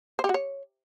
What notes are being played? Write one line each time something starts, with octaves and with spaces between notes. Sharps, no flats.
C5
G4
F#4
C#5